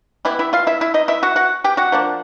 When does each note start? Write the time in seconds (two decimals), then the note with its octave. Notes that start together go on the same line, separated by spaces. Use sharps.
0.25 E3 G3 B3 E4 E5
0.39 E4 E5
0.53 F4 F5
0.67 E4 E5
0.81 E4 E5
0.94 D#4 D#5
1.08 E4 E5
1.23 F#4 F#5
1.36 F#4 F#5
1.64 G4 G5
1.77 F#4 F#5
1.92 F3 A#3 D4